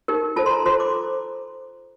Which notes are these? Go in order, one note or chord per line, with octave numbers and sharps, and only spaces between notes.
D#4 G4 A#4
F4 A4 C5 A5
C6
A#5
F4 A4 C5 C6
D6